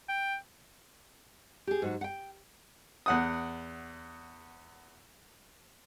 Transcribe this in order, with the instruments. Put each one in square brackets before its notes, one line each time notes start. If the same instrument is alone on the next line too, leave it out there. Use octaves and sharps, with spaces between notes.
[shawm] G5
[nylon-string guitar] G4 G#4
G#2 F#3 F#4
F#5 G5
[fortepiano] E2 F#5 D#6